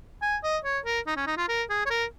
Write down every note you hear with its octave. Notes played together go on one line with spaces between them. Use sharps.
G#5
D#5
C#5
A#4
D#4
C#4
D#4
F4
A#4
G#4
C#5
A#4